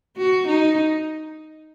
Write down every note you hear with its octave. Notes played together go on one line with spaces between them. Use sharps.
F#4
D#4